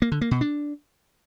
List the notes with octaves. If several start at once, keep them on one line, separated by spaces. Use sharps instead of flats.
A#3
D3
A#3
B2
D4